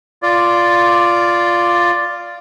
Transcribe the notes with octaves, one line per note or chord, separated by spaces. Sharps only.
F4 D5